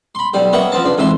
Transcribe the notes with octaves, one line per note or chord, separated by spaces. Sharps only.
B5 C6
B1 G3 G4
A#3 B3 C#5 D#5 E5 F#5
F3 B3 C4 A5
C#3 D4
F2 G#2 E3 E5 C6